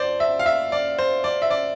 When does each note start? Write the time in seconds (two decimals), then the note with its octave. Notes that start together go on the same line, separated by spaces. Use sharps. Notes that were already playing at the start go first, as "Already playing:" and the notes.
Already playing: F2 C5 D5
0.20 E5
0.39 F5
0.46 E5
0.72 D5
0.99 C5
1.24 D5
1.42 E5
1.51 D5